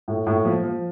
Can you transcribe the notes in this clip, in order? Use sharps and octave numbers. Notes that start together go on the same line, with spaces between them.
A2
A2
F3
F3